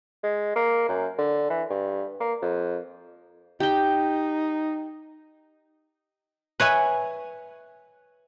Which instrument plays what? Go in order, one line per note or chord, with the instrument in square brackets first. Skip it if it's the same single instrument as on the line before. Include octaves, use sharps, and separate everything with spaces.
[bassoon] G#3
A#3
F#2
D3
E3
G2
A#3
F2
[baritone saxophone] D#4 [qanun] G4 G5
[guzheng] B4 C#5 E5 G#5